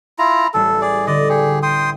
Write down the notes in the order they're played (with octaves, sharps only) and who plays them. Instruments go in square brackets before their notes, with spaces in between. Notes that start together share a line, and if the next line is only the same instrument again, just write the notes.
[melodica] E4 F4 A#5
[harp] A1 G3 [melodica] A4
[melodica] G#4 D5
[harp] D3 [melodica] D5 D#5
[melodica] G4 G#4 [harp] C#6
[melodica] G5 C6 D#6